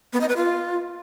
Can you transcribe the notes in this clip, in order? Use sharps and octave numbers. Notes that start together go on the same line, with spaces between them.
B3
D#5
B4
F4